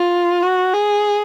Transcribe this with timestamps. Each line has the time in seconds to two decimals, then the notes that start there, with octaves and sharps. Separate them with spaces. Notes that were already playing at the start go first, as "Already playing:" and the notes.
Already playing: F4
0.43 F#4
0.74 G#4